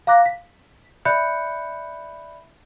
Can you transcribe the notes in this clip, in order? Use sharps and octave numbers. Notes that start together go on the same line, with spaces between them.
F5 A#5 D6 F#6 A#6
B6
D5 E5 B5 F#6 G6 C#7